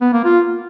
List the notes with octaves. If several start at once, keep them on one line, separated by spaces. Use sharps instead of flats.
B3
A#3
F4